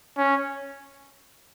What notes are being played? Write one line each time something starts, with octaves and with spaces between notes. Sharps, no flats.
C#4